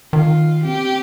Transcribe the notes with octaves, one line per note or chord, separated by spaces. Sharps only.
D#3 F4
C4 G4